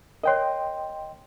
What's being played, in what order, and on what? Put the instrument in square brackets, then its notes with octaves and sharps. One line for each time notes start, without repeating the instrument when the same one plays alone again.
[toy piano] A#4 C#5 [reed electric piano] D#5 G5 C6